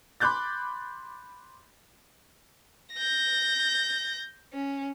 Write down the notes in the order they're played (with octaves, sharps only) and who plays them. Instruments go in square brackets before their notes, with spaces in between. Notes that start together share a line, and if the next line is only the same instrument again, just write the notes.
[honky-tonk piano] B5 C6 D6 F#6 G6 A6
[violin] G6 A#6
C#4